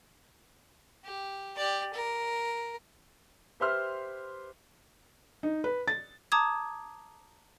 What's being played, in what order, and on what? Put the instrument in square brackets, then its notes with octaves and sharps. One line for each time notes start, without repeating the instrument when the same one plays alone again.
[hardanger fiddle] G4
G4 D5
A#4
[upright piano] G4 B4 C5 E5 C6 F6
[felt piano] D#4
B4
A6
[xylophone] A5 A#5 D6 D#6 G#6